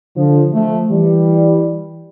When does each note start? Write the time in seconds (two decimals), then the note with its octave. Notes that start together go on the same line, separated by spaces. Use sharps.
0.17 D3 F3
0.53 F3 A3
0.90 E3 G3